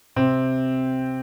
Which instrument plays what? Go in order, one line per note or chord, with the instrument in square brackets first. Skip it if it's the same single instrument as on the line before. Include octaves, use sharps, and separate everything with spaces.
[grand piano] C3 C4